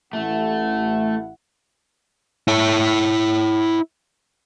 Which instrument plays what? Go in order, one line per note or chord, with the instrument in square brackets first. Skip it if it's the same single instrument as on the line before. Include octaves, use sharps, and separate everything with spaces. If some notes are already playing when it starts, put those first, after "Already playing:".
[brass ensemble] A1 E4 F#5 [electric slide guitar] A3
[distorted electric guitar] E4 C#5